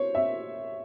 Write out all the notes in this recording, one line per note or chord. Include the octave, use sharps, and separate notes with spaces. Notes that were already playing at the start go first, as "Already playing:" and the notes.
Already playing: C5 C#5
E5